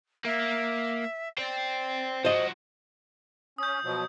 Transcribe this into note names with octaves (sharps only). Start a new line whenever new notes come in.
A#3 E5
C5 D5 G5
F3 F#4 C5 D#5
C#4 D#6 G6
B2 F3 F#3